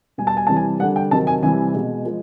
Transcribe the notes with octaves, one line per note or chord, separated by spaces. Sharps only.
B2 G3 G#5
A5
G#5
C3 E3 G3 A5
G#5
D3 G3 F#5
G5
C3 D#3 F#3 A5
G#5
C3 E3 G3 G#5
B2 G#3
F3 G#3